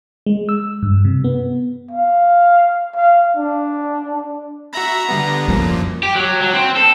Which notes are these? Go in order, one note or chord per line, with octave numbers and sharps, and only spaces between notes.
G#3
E6
G2
C3
B3
F5
F5
D4
F#4 E5 A#5 B5
D3 G3 B3
F#2 A#2 F3 G3
G4
F#3
F#3
C4
A4